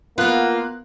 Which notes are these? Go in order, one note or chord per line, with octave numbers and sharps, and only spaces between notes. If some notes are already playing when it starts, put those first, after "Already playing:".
A#3 B3 F4 F#6